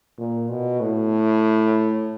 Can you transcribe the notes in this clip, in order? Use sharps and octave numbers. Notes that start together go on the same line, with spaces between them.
A#2
B2
A2